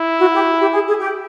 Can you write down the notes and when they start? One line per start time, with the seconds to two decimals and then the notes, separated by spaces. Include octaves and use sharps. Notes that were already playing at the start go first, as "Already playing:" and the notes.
Already playing: E4
0.20 F#4
0.34 G4
0.61 G4
0.74 G#4
0.88 G#4
1.01 G4